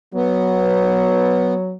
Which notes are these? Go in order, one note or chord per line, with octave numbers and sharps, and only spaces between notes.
F#3 B3